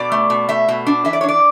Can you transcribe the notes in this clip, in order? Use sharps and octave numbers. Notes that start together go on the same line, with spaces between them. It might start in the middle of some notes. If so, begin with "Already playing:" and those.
Already playing: B2 D5
A3
B2
A3 E5
B2
D4
E3 E5
D5
C#5
D4
D5